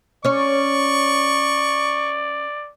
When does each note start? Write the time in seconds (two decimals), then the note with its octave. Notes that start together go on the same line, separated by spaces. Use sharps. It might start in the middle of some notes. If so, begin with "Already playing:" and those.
0.25 C#4 C#5 D5 C#6